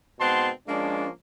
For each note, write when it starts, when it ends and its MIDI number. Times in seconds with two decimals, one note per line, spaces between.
0.20 0.50 44
0.20 0.50 47
0.20 0.50 60
0.20 0.50 78
0.20 0.50 81
0.20 0.50 84
0.68 1.08 53
0.68 1.08 56
0.68 1.08 58
0.68 1.08 61
0.68 1.08 62